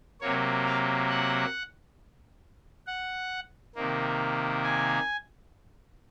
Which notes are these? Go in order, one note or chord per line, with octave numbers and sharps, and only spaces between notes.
C3 F#3 A#3 C#5
F5
F#5
F#5
C3 D#3 A#3
G#5